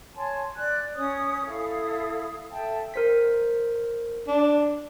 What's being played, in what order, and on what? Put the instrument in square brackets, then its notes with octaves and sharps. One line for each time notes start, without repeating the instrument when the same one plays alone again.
[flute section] C#5 G#5 A5 C6
D5 F#6
C#4 C#5 D#6
E4 A4 F5 D#6
A4 E5 G5 A5
[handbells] A#4 C5 B6
[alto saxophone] D4